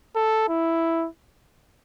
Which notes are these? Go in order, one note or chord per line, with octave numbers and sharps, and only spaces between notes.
A4
E4